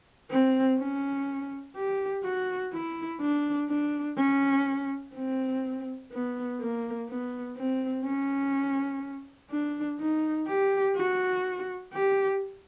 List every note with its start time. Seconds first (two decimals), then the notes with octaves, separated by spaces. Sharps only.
0.30 C4
0.79 C#4
1.75 G4
2.23 F#4
2.72 E4
3.20 D4
3.69 D4
4.17 C#4
5.15 C4
6.12 B3
6.60 A#3
7.08 B3
7.57 C4
8.05 C#4
9.50 D4
9.99 D#4
10.48 G4
10.96 F#4
11.93 G4